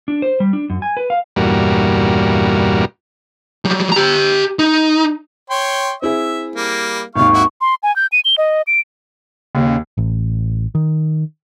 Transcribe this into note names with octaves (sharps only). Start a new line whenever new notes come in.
D4
C5
G3
D4
F#2
G#5
B4
F5
E2 G2 A#2 G3 F#4 A#4
F#3 G3
G4 A#5
D#4
C#5 G5 C6
C4 E4 G#4 E5
G3 A#3
G#1 D#2 F5 C#6
E4 F#4
C6
G#5
G6
D#7
G7
D#5
D7
D#2 C#3
A1
D#3